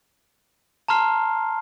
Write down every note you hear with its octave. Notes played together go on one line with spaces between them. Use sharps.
A5 A#5 C6 F6 C7